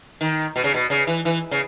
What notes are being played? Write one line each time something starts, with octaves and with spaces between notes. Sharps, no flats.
D#3
B2
C#3
B2
C#3
E3
E3
C#3